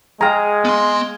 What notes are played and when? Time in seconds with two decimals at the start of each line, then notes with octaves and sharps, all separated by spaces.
0.21 G#3 G#4 F5 G5 A#5
0.65 B3 C6